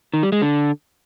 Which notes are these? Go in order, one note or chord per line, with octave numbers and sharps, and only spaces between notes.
D#3
G3
G#3
D3